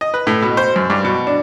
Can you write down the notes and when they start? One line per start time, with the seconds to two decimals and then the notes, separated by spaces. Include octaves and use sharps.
0.01 D#5
0.14 B4
0.27 A2
0.42 B2
0.57 C5
0.76 F#2
0.90 G2
1.04 B2
1.27 D4